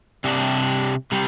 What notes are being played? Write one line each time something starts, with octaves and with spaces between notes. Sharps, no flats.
C3 G3 D4
C3 G3